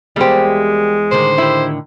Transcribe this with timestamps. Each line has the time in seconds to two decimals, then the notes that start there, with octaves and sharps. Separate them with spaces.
0.16 E2 G3 G#3 A#3 G4 C5
1.11 A2 D3 D#3 C5
1.38 E4 G4